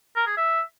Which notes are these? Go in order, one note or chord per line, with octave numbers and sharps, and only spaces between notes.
A#4
G#4
E5